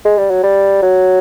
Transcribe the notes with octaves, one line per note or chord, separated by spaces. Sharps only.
G#3
G3
F#3
G3
F#3